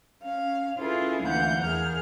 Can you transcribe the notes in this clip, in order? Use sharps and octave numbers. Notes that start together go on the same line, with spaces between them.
C#4 F5
C#4 E4 F4 G#4 A4 B4
D2 E3 A#3 F5 F#5 G6
E2 G#4 A#4 F6